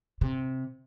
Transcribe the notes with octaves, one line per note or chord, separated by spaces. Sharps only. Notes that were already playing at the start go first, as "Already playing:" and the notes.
C3